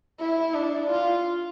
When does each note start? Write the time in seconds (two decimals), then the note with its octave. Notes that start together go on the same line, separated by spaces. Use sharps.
0.20 E4
0.54 D4
0.90 F4